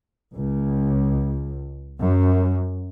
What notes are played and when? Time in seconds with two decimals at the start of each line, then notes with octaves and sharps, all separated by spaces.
0.35 C#2
2.00 F#2